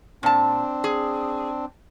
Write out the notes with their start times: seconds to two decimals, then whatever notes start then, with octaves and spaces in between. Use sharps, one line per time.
0.23 A#2 C4 D4 A5
0.84 G#4